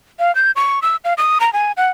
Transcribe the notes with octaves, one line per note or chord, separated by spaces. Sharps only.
F5
G6
C#6
E6
F5
D#6
A#5
G#5
F#5